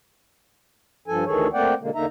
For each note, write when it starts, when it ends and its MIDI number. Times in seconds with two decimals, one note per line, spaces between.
1.08 1.24 43
1.08 1.24 53
1.08 1.24 69
1.08 1.24 80
1.26 1.48 38
1.26 1.48 51
1.26 1.48 52
1.26 1.48 68
1.26 1.48 69
1.26 1.48 73
1.53 1.74 57
1.53 1.74 58
1.53 1.74 60
1.53 1.74 74
1.53 1.74 78
1.53 1.74 79
1.81 1.90 47
1.81 1.90 50
1.81 1.90 56
1.81 1.90 58
1.95 2.05 40
1.95 2.05 50
1.95 2.05 58
1.95 2.05 63
1.95 2.05 76
1.95 2.05 82